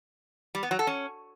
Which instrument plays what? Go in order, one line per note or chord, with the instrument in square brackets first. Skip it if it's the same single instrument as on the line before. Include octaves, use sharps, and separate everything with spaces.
[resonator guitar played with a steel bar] G3
B3
F#3
A4
C#4